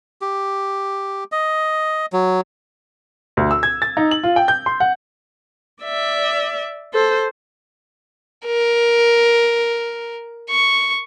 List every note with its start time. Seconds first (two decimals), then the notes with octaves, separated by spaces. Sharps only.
0.21 G4
1.32 D#5
2.13 F#3
3.37 D2
3.51 E6
3.63 G#6
3.82 A6
3.97 D#4
4.11 F#7
4.23 F4
4.36 G5
4.48 G6
4.66 C6
4.80 F#5
5.82 D5 E5
6.94 A4 C5
8.46 A#4
10.50 C#6